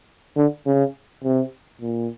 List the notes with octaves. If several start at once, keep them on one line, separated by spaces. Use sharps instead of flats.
D3
C#3
C3
A#2